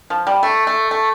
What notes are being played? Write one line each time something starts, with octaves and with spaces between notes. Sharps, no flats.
F3
G3
A3
A3
A3